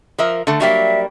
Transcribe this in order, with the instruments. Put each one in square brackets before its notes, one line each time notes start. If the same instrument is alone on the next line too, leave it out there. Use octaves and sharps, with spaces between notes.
[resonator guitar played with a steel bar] F3 A#4 E5
D3 A3
[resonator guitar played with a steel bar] F#3 G3 A#3 [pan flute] E5